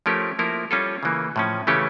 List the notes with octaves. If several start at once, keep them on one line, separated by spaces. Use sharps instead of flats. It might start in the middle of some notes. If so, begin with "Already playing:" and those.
F3 A3 C#4 G4 A#4
F3 A#3 E4 A#4
G3 C#4 F4 A4
C#3 E3 A#3
A2 F3 C#4
C#3 E3 A3 C#4 G4